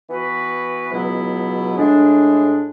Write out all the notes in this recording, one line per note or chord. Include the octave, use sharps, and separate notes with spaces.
E3 B3 F#4 B4
C#2 B2 F#3 B3 E4
A2 G#3 D4